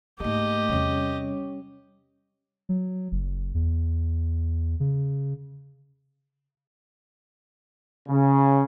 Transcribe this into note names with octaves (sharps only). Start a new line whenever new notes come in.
G#2 A3 A#3 G4 D#5
E2 C3 G3 C#4 C#5
F#3
F#1
E2
C#3
C#3